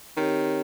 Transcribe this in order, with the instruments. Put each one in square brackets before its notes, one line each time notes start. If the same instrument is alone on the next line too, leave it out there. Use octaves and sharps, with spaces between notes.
[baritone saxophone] D#3 [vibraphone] C4 G4 C#5